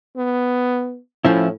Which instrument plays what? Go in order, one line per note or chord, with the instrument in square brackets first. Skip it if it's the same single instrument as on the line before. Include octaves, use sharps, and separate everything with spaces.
[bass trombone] B3
[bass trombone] A2 [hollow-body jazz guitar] F3 C#4 E4